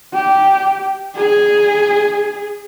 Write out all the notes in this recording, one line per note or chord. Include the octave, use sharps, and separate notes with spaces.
G4
G#4